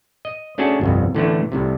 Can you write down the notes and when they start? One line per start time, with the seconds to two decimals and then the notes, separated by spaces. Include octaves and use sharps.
0.25 D#5
0.58 A3 C#4 D4 F#4 G#4 A5
0.81 G1 C2 F2
1.15 A2 D3 E3 A3
1.52 C2 A2 C3